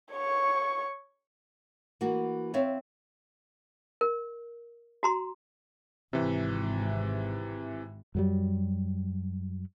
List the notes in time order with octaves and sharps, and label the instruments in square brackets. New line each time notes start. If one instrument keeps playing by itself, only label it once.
[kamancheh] C#5 C#6
[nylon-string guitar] E3 A#3 F#4
C4 C#5 E5 F5
[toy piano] A#4
F#4 A#5 C6
[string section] G#1 [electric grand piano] C3 E3
[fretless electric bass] F#2 F#3 G3